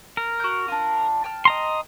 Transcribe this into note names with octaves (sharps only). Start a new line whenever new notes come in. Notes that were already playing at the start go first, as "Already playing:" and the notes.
A#4
F#4 G6
D4 F4
G5 A5 F6
D#5 A#5 C6